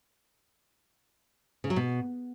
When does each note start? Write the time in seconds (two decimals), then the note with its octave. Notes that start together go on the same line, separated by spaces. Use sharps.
1.64 C#3
1.70 F#3
1.76 B2